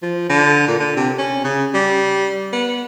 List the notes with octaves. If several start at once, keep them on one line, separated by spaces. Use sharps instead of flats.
F3
D3
A#2
D3
C3
C#4
C#3
G3
B3